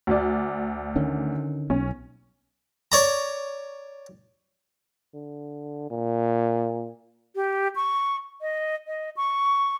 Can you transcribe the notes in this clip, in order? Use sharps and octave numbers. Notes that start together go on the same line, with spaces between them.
D2 D5
D3 D#3 C#4
B1 C#4
C#5 D5 A#5
D3
A#2
G4
C#6
D#5
D#5
C#6